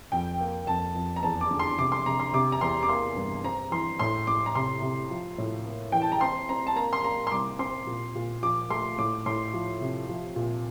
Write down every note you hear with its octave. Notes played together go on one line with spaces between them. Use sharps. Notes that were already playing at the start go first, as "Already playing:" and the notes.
F2 G5
A#3
F2 A5
F2
A#5
E2 A5
D6
D3
C6
C3 D6
C6
C3 A#5
C6
C3 D6
A#5
E2 C6
D6
A#3 C6
G2
C4 A#5
E3 C6
A2 C6
A2 D6
A#5
C3 C6
C3
F3
A2
A#3
E3 G5
A5
A#5
C4 C6
C4 A#5
A5
A#3 A#5
C6
A#3 A#5
C6
C2 D6
C4 C6
A#2
A#2
F3 D6
A3 C6
A2 D6
A2 C6
F3
C3
F3
A#2